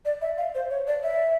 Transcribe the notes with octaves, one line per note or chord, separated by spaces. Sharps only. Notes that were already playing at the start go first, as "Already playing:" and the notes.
D5
E5
F5
C5
C#5
D5
E5